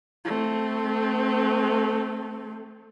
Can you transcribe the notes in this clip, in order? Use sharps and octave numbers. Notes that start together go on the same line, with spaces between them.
A3 C4